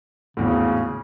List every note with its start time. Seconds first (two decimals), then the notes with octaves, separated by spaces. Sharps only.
0.37 G#1 E2 A2 C#3